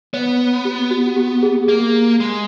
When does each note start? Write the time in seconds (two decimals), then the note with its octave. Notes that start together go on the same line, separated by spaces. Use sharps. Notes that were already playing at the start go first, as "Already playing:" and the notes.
0.13 B3 C#5
0.65 G4
0.91 F#4
1.16 G4
1.43 G#4
1.68 A#3 G#4
2.20 G#3